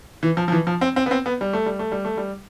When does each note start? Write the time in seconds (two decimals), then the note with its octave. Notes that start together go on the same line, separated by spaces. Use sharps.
0.23 E3
0.37 F3
0.48 F3
0.52 E3
0.67 F3
0.81 C4
0.96 C4
1.06 B3
1.11 C4
1.26 B3
1.41 G3
1.53 A3
1.66 G3
1.79 A3
1.92 G3
2.05 A3
2.17 G3